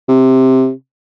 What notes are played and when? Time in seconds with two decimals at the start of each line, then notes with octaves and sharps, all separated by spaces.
0.08 C3